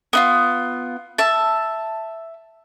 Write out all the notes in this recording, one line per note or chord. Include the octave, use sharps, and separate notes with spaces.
B3 D#4 F4
E5 A5